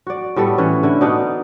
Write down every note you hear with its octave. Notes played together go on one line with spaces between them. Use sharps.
F#4 D5
A2 G3 B3 A4
E3 C#4
D3 E4
B2 B3 D4 D#4